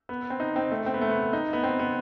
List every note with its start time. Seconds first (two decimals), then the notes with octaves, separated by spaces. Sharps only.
0.09 B3
0.30 C4
0.40 D#4
0.56 C4
0.71 A3
0.86 C4
0.94 B3
1.01 A3
1.09 B3
1.33 D#4
1.53 B3
1.63 C4
1.79 B3